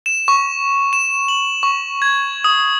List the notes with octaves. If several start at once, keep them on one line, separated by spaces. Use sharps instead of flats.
E7
C#6
E7
F#7
C#6
G#6
D#6